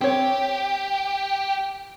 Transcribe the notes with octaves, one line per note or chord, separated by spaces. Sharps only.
C4 G4 C#5